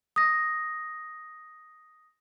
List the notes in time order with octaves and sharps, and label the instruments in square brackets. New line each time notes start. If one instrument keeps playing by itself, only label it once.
[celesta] D#6 A#6